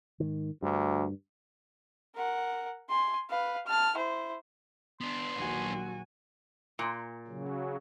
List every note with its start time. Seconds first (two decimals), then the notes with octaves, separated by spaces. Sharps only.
0.20 G#2 D#3
0.62 D2 G2
2.15 A#4 F#5
2.89 G#5 C6
3.30 B4 F5
3.67 A5 F6
3.95 E4 C5
5.01 B3 D4 C6
5.36 A#1 D#2 F#3 F#4 G#5
6.79 A#2
7.27 C#3 F#3